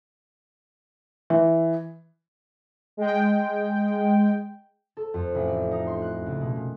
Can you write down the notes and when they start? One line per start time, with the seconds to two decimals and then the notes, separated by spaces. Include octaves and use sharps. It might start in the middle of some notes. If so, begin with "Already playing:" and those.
1.30 E3
2.97 G#3 G5
4.97 A4
5.14 F2
5.35 A1
5.48 D5
5.71 D#4
5.87 C6
6.02 F#6
6.26 C#2
6.41 B2
6.56 A#2